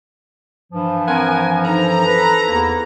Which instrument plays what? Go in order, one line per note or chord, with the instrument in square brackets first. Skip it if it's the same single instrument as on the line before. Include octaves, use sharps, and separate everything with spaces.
[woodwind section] G2 E3 F3
[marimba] C4 [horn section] A#4 F#5 G#5
[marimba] D#4 C5 [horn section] A4 A#5
[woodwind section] B4
E2 A#3 E4